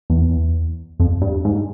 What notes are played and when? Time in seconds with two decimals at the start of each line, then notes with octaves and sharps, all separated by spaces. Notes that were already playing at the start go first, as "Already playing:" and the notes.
0.10 E2
1.00 F2
1.21 G2
1.45 G#2